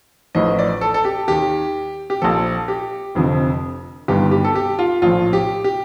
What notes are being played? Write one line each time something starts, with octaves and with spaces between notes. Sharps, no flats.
A1 A2 F3 D#5
D5
A4
A4
G4
D#2 D#3 G4
G4
A#1 A#2 F3 A4
G4
F1 F2 D3 F3
G1 G2 D#3 G4
G4
A4
G4
F4
A#1 A2 F3 F4
G4
G4